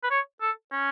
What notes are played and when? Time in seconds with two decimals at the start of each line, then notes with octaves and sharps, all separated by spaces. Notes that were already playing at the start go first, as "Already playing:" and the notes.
0.03 B4
0.10 C#5
0.41 A4
0.72 C#4